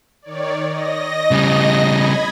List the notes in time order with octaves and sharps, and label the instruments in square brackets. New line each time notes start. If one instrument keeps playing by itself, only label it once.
[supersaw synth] D#3 C#5 D5
D#5 A#6
[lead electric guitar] C#3 G3
[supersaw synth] B5 G#6